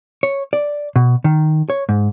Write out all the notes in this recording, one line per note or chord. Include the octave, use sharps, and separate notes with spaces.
C#5
D5
B2
D#3
C#5
G#2